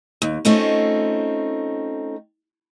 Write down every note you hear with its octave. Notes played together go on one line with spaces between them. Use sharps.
D#2
A3 C4 C#4 D#4 F4